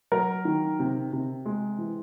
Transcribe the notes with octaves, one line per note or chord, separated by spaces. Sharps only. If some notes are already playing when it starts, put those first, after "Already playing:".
F#3 A#4
D#3
C3
C3
G#3
E3